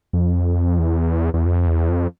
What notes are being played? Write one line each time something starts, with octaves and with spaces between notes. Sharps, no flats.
F2
E2
E2
F2
E2
F2